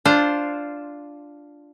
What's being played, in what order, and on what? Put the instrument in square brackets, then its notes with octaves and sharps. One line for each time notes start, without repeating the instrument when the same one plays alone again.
[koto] D4 F4 C5